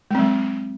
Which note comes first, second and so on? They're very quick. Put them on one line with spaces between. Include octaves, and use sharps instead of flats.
G#3 C4 F#3